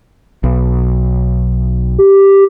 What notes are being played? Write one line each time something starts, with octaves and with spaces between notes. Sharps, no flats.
B1
G4